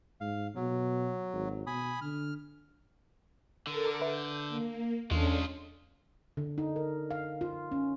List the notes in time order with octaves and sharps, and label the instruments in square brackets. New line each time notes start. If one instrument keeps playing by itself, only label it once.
[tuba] G#2 [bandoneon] F5
[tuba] B2 [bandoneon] F#3
[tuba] G#1
[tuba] B2 [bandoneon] G#5 B5 D#6
[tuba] D3 [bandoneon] F6
[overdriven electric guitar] D3 [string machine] A4 A#4 D6
[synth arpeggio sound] B4 E5 [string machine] G6
[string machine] A#3
[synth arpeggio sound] E2 [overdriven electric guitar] G#3 F4 [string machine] C#4 D4 A4
[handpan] D3
D#4
A#4
F5
F4
C#4